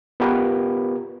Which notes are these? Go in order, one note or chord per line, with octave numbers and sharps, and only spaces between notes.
B3 F4 G4 A#4 B4